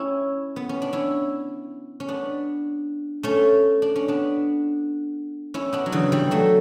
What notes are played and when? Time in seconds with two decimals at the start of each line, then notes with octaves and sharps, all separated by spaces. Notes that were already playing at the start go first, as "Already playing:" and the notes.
Already playing: C#4 E4
0.56 B3
0.69 C#4
0.82 D4
0.93 C#4 E4
2.00 C#4
2.09 B3 D4
3.23 A3 C#4
3.82 D4
3.96 C#4
4.08 B3 D4
5.54 C#4 E4
5.73 B3 D4
5.86 F#3
5.92 C#3 E3
6.12 E3 G3
6.31 F#3 A3